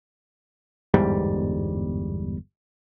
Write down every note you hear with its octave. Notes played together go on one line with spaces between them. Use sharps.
G1 E2 G#2 G3